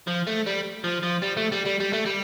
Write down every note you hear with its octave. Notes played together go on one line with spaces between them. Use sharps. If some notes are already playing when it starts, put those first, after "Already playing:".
F3
A3
G3
F3
F3
G3
A3
G3
G3
G3
A3
G3